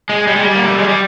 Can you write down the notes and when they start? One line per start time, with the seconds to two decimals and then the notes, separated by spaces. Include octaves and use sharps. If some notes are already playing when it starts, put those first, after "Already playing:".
0.09 G#3
0.27 G3
0.36 G#3
0.43 G3
0.55 A#3
0.67 A3
0.78 G#3
0.89 G3